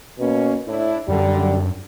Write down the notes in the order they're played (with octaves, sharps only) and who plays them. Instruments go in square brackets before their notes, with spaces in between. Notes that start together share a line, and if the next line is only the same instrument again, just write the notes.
[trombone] B2 [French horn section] A#3 C#4
[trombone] A2 [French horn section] D4 E4
[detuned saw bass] F#2 [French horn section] D3 [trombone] G3